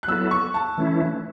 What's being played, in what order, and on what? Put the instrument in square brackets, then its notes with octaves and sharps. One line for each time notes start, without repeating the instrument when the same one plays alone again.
[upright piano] F#6
[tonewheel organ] F#3 B3 E4 A4 [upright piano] E6
[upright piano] C#6
A5
[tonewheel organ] E3 A3 C#4 E4